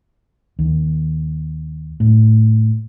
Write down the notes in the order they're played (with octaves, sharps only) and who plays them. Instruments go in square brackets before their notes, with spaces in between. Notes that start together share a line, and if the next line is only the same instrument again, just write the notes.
[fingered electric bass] D#2
A2